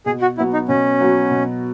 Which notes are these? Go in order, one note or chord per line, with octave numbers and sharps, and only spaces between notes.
B2 G#4
F#4
F#3 B3 E4 F#4
D#4
B2 C#4
F#3 B3 F#4
B2